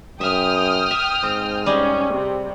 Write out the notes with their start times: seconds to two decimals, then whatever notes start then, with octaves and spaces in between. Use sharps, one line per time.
0.21 F#2 E5 G5 D#6 F6
0.91 E5
1.23 G#2 C4
1.66 G3 C#4 G#4 D#5
2.14 C3